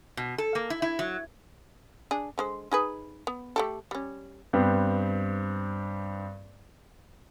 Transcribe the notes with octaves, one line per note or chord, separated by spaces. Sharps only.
B2
A4
A#3
E4
E4
F#3
D4 G#4
D3 G#3 C5
D#4 G#4 B4
B3
A3 G4 A4
G3 C#4
G2 B3 C4